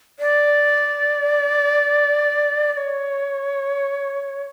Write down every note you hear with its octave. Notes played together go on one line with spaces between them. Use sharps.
D5
D5
C#5